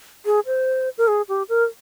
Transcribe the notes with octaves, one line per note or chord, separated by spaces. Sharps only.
G#4
C5
A#4
G#4
G4
A#4